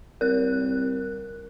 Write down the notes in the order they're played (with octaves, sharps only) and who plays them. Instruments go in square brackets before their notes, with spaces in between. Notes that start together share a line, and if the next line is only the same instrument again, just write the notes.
[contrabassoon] C2 [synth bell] A#4 F#6